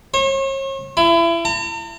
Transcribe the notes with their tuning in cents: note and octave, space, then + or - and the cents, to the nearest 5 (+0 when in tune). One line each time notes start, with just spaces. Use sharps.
C#5 -40
E4 +30
A#5 -45